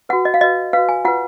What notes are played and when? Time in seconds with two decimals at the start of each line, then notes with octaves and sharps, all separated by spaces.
0.09 F#4 B4 F#5
0.25 D#5
0.34 F5
0.41 F#4 B4 D#5
0.73 F#4 B4 F5
0.89 G#5
1.05 F4 B4 F#5